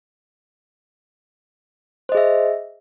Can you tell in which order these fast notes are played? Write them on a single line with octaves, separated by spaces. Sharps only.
C5 D#5 G#4 E5